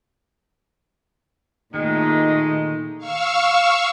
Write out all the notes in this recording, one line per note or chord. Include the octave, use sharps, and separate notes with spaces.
A#2 D#3 G#3 A3 D#4
F5 C#6 E6